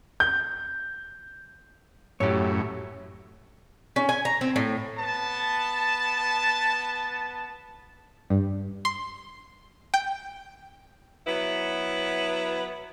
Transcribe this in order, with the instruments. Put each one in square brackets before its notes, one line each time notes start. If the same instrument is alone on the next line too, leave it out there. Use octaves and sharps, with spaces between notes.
[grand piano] G6
[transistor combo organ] F#2 A2 [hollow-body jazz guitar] G4 C#5
[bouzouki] C#4
G#5
A#5
C4
A2
[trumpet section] B3 A5
[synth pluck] G2
C6
G5
[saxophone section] F#3 B3 E4 B4